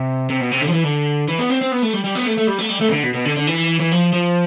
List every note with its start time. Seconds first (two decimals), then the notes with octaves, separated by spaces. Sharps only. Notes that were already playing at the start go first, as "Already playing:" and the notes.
Already playing: C3
0.30 C3
0.41 B2
0.52 C3
0.62 D3
0.69 F3
0.73 E3
0.84 D3
1.28 E3
1.39 B3
1.50 C4
1.61 C4
1.72 B3
1.83 A3
1.94 G3
2.04 G3
2.16 B3
2.27 A3
2.38 A3
2.48 G3
2.59 A3
2.70 G3
2.81 A3
2.89 C3
2.92 D3
3.04 B2
3.14 B2
3.25 D3
3.36 D3
3.47 E3
3.80 E3
3.92 F3
4.13 F3